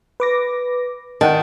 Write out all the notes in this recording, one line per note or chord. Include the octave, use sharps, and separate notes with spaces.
B4 D6 A#6
D#3 F#5 G5 A5